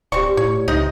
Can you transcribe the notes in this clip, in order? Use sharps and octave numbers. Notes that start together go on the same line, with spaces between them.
D1 C4 G4 D5 C#6
A2 C#5
C#2 C3 D#4 D#5